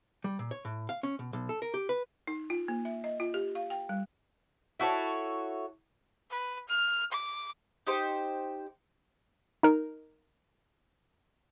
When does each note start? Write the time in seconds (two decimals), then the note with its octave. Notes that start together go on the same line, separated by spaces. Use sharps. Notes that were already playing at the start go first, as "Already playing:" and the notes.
0.24 G3
0.39 A#2
0.51 C#5
0.65 A2
0.89 F5
1.03 C#4
1.19 B2
1.33 B1
1.49 A4
1.62 A#4
1.74 G4
1.89 B4
2.27 D#4
2.50 F4
2.68 A#3
2.85 E5
3.04 D#5
3.20 F4
3.34 G4
3.55 F5
3.70 G5
3.89 G3
4.80 E4 F#4 A4 C#5
6.30 B4
6.69 F6
7.12 D6
7.87 D#4 G4 C5
9.63 D#4 A#4